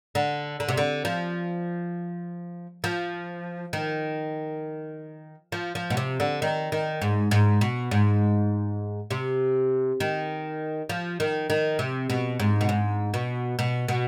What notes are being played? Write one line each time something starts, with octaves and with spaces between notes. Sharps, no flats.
D3
D3
C3
D3
F3
F3
D#3
F3
F3
B2
C3
D3
D#3
D#3
G#2
G#2
B2
G#2
C3
D#3
F3
D#3
D#3
C3
B2
G#2
B2
G#2
B2
B2
B2